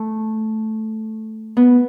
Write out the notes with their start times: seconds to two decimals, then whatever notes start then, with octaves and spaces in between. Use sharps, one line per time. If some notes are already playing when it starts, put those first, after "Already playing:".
Already playing: A3
1.57 B3